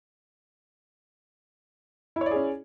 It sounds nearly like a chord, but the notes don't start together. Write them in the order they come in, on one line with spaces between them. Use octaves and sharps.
E4 C#5 D5 G#4 C#4